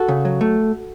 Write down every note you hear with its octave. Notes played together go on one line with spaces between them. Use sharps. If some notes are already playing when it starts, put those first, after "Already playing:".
Already playing: F#4 A4
C#3
F#3
A3